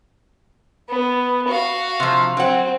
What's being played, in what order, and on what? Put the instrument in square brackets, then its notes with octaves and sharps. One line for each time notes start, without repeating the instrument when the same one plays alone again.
[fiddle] B3
F#4 F5
[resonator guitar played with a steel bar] C3 F3
[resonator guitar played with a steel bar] F#3 F#5 [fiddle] C4